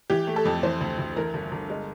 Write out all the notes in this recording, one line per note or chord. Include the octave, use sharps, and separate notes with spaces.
E3 G4
A3
A4
F2
E3 C5
D2
D2
E3 A#4
G1
G1
G#3